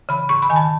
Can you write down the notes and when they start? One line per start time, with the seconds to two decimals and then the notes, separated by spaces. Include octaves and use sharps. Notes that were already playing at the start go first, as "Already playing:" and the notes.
0.09 C#3 E3 B5
0.29 G#2 C#6
0.42 B5
0.50 D#3 G#5
0.56 A5